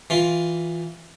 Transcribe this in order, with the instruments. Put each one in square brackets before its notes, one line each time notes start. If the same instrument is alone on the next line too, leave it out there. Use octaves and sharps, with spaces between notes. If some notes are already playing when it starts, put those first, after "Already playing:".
[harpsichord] E3 F4